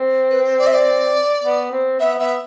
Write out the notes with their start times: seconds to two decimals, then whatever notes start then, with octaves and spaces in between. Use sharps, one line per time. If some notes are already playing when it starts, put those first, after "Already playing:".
Already playing: C4
0.30 B4
0.44 C5
0.58 D5
0.67 E5
0.73 D5
1.43 B3
1.71 C4
2.00 B3 E5
2.18 B3 E5